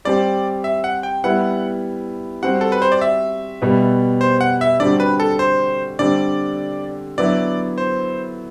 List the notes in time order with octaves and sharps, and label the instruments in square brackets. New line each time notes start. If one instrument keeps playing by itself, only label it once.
[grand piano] G3 C4 G4 [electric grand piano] D5
[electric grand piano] E5
F#5
G5
[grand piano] G3 B3 E4 [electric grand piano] F#5
[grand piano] G3 C4 F#4 [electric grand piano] F#5
[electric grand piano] A4
B4
C5
D5
E5
[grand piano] B2 G3 B3
[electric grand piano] C5
F#5
E5
[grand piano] D3 G3 C4 F#4 [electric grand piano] D5
[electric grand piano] B4
A4
C5
[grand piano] D3 G3 C4 [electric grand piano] D5
[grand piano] D3 F#3 B3 E4 [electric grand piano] D5
[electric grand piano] C5